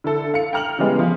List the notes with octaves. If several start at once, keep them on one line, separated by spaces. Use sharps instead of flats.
D3 E4 A4
F5 C#7
G5 A#5 F6 F7 F#7
C#3 E3 G3 G#3 B3
F3 F4